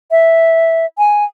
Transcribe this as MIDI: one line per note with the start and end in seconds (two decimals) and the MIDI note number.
0.11 0.86 76
0.98 1.24 80